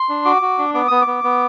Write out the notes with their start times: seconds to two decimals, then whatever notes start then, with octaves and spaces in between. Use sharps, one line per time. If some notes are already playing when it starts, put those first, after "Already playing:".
Already playing: C6
0.09 D4
0.25 F#4 D6
0.42 F#4
0.58 D4
0.74 B3 D6
0.88 B3 D#6
1.02 D6
1.07 B3
1.24 B3